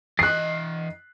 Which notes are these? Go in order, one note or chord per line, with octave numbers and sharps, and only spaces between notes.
E3 D#5 F#6 C7